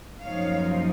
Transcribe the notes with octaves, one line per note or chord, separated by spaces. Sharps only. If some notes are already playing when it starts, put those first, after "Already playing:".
F#2 F3 A#3 D#4 C#5 F5